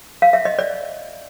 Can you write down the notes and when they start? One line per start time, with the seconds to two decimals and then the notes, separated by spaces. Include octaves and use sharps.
0.22 F5
0.33 E5
0.45 D#5
0.59 D5